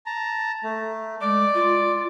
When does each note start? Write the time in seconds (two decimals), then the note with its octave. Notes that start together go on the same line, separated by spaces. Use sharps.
0.06 A5 A#5
0.64 A3
1.21 G#3 D5 D6
1.55 F4